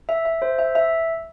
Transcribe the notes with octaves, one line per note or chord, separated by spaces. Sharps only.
E5
E5
C5
E5
E5